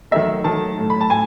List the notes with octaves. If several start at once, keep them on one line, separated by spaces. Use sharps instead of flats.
D#3 F#3 A3 E5
D#3 F#3 A3 A5
A2 F#3 A3
B5
A5
A2 G#5